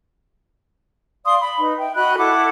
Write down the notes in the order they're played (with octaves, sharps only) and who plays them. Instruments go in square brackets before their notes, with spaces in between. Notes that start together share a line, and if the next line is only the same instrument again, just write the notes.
[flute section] D5 F5 C6 D#6
B5
D#4 B4
E5 G5
F#4 D#5 B5 F#6
E4 A4 F#5 D6